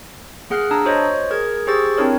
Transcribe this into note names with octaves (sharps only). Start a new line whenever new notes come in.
A#3 G#4 F#5 F6 F#6 C7
D4 A5 A#5 D#6 E6
F#4 C5 C#5 D#5
G#4 A#4 G#6
G4 G#4 C5 C#6 E6 A6
C4 D4 E4 A#4 C#5